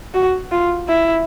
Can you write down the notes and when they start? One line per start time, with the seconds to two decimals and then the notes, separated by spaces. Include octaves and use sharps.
0.14 F#4
0.52 F4
0.88 E4